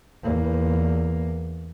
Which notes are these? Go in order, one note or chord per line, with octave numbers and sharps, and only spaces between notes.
E2 A#3